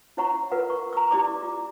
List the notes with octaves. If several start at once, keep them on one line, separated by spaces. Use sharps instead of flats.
E4 F4 C#5 F#5 A#5 C#6
F4 A#4 B4 F#5
C#6
A#5 C#6 E6
E4 G4 D5 A#5 D6
F4